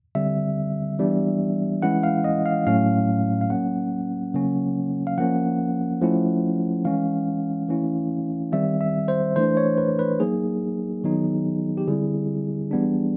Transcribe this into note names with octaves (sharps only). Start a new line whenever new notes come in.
D3 G3 C4 E5
E3 G3 B3 D4
E3 G#3 C#4 E4 F#5
F5
D#5
F5
A2 F#3 A3 C#4 F5
F5
F#3 A#3 C#4 F#5
C#3 F#3 A#3 C#4
F5
F3 A#3 C#4 F#5
F3 A3 C#4 E4
E3 G#3 C#4 F5
E3 A3 C#4 E4
D#3 G3 C4 E5
E5
C5
E3 A3 D4 C5
C#5
B4
B4
F#3 A#3 D#4 G#4
D#3 F#3 B3 D#4
G4
D3 G3 C4 E4 G#4
E3 G3 B3 D4